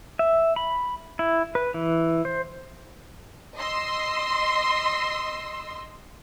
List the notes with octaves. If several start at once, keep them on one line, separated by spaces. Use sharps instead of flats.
E5
B5
E4
B4
E3
C5
D#5 C6 E6